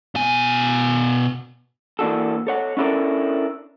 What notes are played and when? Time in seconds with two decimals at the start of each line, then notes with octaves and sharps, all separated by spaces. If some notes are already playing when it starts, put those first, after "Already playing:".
0.15 B2 G#5
1.99 E3 A#3 D4 F#4 A4
2.47 A4 C#5 F#5
2.77 C#4 D4 E4 A4 A#4